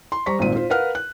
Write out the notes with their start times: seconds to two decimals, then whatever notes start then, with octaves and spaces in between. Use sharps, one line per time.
0.12 C6
0.26 G3 C5 A#5 C#6 B6
0.39 G#1 A#2 C4 D#7
0.56 F4 C5
0.70 A#4 B4 F5 F#5 F6
0.95 F#6